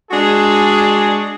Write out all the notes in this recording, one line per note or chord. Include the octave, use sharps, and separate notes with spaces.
G#3 D4 F#4 G#4